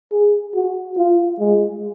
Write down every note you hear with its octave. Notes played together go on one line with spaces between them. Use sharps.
G#4
F#4
F4
G#3